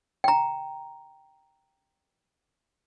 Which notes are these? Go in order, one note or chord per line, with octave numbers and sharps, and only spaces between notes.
G5 A#5